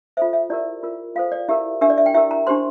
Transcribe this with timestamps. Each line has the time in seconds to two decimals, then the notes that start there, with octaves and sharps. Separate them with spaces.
0.17 F4 A4 C5 E5
0.33 E5
0.50 E4 G4 A#4 D5
0.83 F4 A#4
1.15 F4 A4 C5 F5
1.32 D5
1.49 E4 G4 A#4 E5
1.81 D4 G4 A#4 E5
1.90 D5
1.98 E5
2.06 G5
2.14 E4 G4 A#4 E5
2.31 A#5
2.47 D4 G4 C5 C6